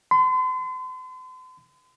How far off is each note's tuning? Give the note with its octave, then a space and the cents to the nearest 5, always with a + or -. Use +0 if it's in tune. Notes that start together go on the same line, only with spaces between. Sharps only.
C6 -40